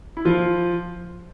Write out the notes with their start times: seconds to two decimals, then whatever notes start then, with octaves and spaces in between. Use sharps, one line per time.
0.17 E4
0.25 F3 F4